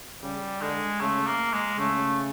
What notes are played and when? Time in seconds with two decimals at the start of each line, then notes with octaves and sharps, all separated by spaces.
0.22 C#3 G3
0.61 D3 G#3
1.01 C#3 A3
1.27 A#3
1.53 G#3
1.79 C#3 A3